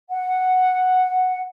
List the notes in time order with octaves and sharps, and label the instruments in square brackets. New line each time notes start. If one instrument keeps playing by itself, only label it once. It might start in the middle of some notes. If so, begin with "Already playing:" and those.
[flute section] F#5